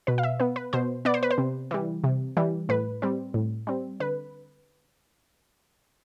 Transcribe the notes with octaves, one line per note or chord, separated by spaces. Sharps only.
B2 B4
F5
E5
B3 B4
B4
B2 C5
B3 D5
C5
B4
C5
C3
E3 G3
C3
E3 G3
A2 B4
G3 C4
A2
G3 C4
D3 B4